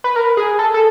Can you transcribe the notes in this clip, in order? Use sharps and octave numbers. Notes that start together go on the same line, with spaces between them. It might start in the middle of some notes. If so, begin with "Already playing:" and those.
B4
A#4
G#4
A4
A4